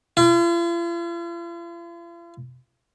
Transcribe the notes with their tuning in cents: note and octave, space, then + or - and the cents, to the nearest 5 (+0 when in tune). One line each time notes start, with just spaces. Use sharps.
F4 -45